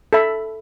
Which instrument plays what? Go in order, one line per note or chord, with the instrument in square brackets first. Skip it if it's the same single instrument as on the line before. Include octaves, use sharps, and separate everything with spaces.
[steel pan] A4 E5 B5